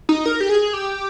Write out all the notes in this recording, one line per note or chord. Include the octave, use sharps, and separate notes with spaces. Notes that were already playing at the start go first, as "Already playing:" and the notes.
D#4
A#4
G4
G#4
G4